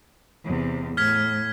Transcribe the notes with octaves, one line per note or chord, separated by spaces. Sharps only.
E2 C3
A2 F6 G#6 B6